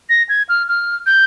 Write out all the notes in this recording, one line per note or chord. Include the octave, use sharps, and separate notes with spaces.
A#6
G#6
F6
F6
G6